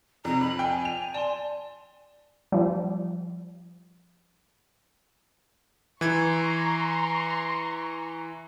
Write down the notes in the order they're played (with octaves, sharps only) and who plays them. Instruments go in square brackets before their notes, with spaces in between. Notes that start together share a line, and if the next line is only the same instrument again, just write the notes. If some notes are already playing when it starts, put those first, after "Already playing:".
[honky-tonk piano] F2 C3 [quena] A#5
[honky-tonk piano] F2 [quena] B5
[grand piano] G5 [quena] G#5
[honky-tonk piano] F7
[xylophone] D5 C6 [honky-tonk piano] A5
[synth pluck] F3 G3
[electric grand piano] E3 G#6 [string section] A#5 C6 C#6